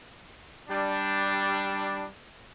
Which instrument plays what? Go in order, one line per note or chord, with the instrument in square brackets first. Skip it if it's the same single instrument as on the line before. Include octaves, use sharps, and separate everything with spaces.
[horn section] G3 D4